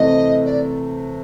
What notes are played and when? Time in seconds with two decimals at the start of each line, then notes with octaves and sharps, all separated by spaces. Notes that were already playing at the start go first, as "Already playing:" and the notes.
Already playing: C3 E3 A3 D#5
0.45 D5